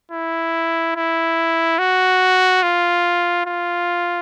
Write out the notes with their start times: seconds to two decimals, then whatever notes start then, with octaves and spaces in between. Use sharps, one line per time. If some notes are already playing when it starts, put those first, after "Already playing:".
0.12 E4
0.95 E4
1.78 F#4
2.63 F4
3.46 F4